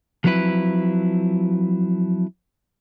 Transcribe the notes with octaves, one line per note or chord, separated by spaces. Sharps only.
F3 F#3 C4 E4 B4